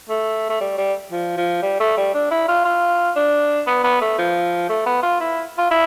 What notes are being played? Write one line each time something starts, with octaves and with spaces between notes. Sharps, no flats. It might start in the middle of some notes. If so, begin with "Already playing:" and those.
A3
A3
G3
G3
F3
F3
G3
A3
G3
D4
E4
F4
F4
D4
B3
B3
A3
F3
A3
B3
F4
E4
F4
E4